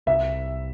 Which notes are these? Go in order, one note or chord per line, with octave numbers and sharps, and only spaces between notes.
C2 E5